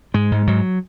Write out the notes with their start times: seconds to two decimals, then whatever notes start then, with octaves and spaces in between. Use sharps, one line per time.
0.14 G#2 G#3
0.32 G#2
0.47 G#2 F#3